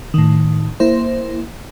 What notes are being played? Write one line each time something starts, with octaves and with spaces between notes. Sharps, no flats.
A2 D#3
A#3 E4 C5